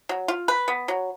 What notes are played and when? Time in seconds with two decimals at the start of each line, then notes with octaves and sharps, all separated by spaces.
0.09 F#3
0.28 F4
0.48 B4
0.68 B3
0.88 F#3